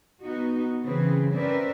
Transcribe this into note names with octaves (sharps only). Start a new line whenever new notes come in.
B3 D#4 F#4
C#3 E3 C4 G#4 B4
C4 C#4 A#4 B4 D5 E5